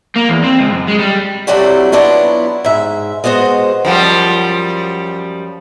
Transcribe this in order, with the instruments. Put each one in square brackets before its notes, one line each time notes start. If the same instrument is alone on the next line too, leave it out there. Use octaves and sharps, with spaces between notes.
[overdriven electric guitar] A#3
E2
C4
C#2
F#2
G#3
G3
[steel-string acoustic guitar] C3 F#3 A3 D4 E4 F#4
F#3 B3 D4 E4 F4
G#2 E5
G#3 B3 F#4 C5 D#5
[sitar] F#2 F3 G3